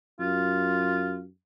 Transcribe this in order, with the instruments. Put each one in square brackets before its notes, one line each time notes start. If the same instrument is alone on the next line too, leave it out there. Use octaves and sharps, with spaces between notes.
[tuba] F#2 [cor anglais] F4